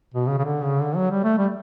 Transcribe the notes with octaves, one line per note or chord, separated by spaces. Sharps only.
B2
C#3
C#3
D3
C#3
D3
F#3
G3
A3
G3